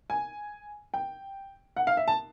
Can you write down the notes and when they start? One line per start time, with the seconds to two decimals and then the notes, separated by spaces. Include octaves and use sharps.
0.10 G#5
0.94 G5
1.76 F#5
1.87 F5
1.97 E5
2.08 A5